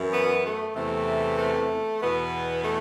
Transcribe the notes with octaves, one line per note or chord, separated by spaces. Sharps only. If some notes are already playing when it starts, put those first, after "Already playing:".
Already playing: F#2 E3
B3
A3
E2 C3 E3 A3
A3
E2 B2 B3
A3